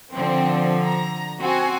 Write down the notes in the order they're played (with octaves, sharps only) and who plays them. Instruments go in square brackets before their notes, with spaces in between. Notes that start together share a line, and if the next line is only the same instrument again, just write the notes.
[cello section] D3 F3 [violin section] C4
[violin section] A#5
[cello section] C4 [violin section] F#4 G#5